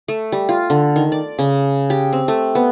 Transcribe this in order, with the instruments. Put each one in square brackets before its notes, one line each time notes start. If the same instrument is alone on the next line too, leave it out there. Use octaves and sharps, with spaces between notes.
[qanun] A3
G3
F4
D3
D#3
D5
C#3
G4
C4
A3
B3